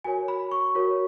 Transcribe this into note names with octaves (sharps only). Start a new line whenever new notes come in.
F#4 A#4 C#5 G#5
B5
C#6
F#4 A#4 C#5